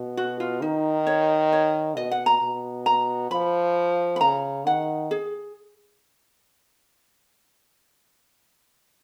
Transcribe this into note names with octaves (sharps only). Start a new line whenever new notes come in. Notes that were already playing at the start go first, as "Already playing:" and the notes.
Already playing: B2
F#4
F4
D#3 D#4
C#5
C#5
B2 D#5
F#5
A#5
B2
A#5
F3 B5
B5
C#3 A#5
D#3 F#5
G#4